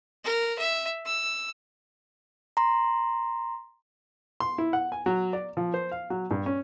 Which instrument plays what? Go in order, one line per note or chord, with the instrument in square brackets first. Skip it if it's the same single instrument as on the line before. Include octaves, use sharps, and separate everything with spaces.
[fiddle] A#4
E5
E6
[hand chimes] A#5 C6
[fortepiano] C6
E4
F#5
G#5
F#3
D5
F3
C5
F5
F#3
G2
C#4